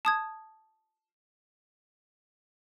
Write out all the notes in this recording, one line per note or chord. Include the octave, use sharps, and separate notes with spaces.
A5 D#6 G#6